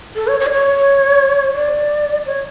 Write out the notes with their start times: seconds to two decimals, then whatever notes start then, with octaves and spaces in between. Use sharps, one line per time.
0.16 A4
0.28 C#5
0.40 C#5
0.46 D5
0.52 C#5
1.56 D5
2.26 C#5